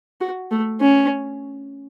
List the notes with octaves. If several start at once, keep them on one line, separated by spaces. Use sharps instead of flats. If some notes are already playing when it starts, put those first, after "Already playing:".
F#4
A3
C#4